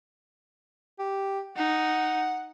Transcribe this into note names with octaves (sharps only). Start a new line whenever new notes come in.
G4
D#4 F#5